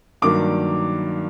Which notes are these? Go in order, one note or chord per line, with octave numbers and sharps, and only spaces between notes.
G2 D#3 F#3 A#3 D4 D6